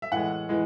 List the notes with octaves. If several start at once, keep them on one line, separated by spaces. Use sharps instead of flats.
E5
A2 E3 G#3 F#5
E3 G#3